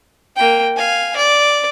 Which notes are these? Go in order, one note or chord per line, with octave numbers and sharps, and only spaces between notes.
A#3 G5
F5 G#5
D5